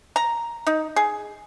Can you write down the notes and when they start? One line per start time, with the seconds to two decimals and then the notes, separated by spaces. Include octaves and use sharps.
0.16 A#5
0.67 D#4
0.96 G#4